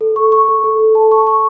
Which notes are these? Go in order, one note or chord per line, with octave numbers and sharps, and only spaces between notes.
A4
C#6
C#6
A4
A4
A4
A5
C#6
C#6